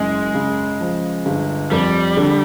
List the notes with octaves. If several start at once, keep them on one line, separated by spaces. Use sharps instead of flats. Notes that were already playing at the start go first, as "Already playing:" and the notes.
Already playing: F#1 F#2 G#3
C#3
F3
G1
F2 G3
D3